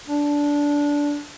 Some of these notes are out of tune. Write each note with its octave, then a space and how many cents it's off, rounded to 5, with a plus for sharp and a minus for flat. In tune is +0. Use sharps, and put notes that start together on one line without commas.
D4 -15